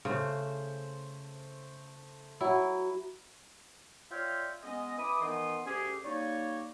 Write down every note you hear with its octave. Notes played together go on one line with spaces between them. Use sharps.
C#3 A3 C5
F#3 E4
F4 C#5 D5 E5 F5 G5
G#3 B3 C#4 D#5
E3 B5 D6 D#6
D#3 E3 B3 C6 D#6
D2 C#4 G4 G#4
G3 A#3 D#4 C#5